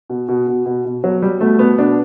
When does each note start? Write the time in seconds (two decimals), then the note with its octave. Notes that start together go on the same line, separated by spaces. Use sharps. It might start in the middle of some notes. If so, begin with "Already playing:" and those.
0.10 B2
0.28 B2
0.48 B2
0.66 B2
0.85 B2
1.04 B2 F#3
1.22 B2 G3
1.41 B2 A3
1.59 B2 B3
1.78 B2 D4